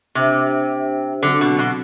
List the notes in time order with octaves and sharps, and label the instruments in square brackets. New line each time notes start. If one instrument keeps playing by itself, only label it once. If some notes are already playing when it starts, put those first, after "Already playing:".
[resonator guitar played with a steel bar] C3 [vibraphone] D4 G4 C5 E5
[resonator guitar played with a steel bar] D3 [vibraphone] F#3 C4 F#4
[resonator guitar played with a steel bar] B2
B2